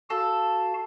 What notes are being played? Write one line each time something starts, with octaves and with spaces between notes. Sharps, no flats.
F#4 A4 F5 A5